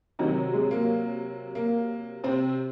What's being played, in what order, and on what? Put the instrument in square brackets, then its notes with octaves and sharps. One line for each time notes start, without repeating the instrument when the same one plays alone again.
[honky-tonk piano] C3 D#3 F#3 D#4
G#3
A#3
A#3
C3 C4